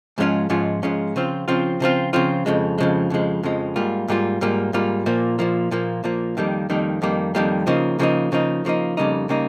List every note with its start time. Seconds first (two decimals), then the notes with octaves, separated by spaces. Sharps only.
0.18 G#2 F3 G#3 C#4 F4
0.50 G#2 F3 G#3 C#4 F4
0.83 G#2 F3 G#3 C#4 F4
1.16 C#3 F3 C4 F4
1.48 C#3 F3 C4 F4
1.80 C#3 F3 C4 F4
2.13 C#3 F3 C4 F4
2.46 F2 C#3 F3 G#3
2.78 F2 C#3 F3 G#3
3.10 F2 C#3 F3 G#3
3.43 F2 C#3 F3 G#3
3.76 G#2 G3 A#3 F4
4.08 G#2 G3 A#3 F4
4.41 G#2 G3 A#3 F4
4.73 G#2 G3 A#3 F4
5.06 A#2 F3 A#3
5.39 A#2 F3 A#3
5.71 A#2 F3 A#3
6.04 A#2 F3 A#3
6.37 F2 D#3 G3 A#3
6.70 F2 D#3 G3 A#3
7.02 F2 D#3 G3 A#3
7.35 F2 D#3 G3 A#3
7.67 C#3 F3 A#3 D#4
7.99 C#3 F3 A#3 D#4
8.32 C#3 F3 A#3 D#4
8.65 C#3 F3 A#3 D#4
8.97 F2 C#3 G3 A#3 D#4
9.29 C#3 G3 A#3 D#4